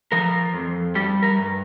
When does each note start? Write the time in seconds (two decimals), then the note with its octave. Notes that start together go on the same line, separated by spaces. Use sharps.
0.12 F3 A#4
0.54 F2
0.95 G3 G4
1.23 A#4
1.37 G2